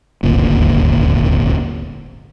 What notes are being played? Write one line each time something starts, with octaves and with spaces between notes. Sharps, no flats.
D#1 G#1 D2 A#2